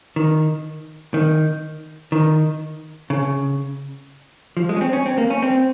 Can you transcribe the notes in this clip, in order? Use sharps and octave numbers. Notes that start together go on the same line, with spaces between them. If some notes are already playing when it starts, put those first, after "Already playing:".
D#3
D#3
D#3
C#3
F3
G#3
C#4
C4
C#4
C4
A#3
C#4
C4